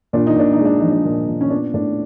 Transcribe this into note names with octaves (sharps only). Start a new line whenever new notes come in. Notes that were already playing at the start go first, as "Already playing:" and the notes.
A#2 D4
D#4
A#2 D4
D#4
G#3
D4
F3 D#4
D4
A#2
A#2
C#4
B3 D4
A2 D4